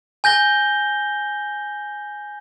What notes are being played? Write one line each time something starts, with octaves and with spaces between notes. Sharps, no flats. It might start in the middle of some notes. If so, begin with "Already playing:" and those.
G#5 G6 A#6 G7